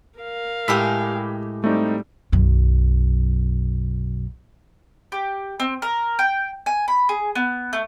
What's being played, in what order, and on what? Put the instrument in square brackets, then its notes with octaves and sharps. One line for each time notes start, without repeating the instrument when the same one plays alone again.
[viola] A#4 F5
[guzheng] A2 G#3 G4 [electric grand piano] B5 E6 B6
[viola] G3 [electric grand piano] A3 C4 D#4
[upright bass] B1 F#2
[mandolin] G4
C4
A#4
G5
G#5
B5
G#4
B3
A3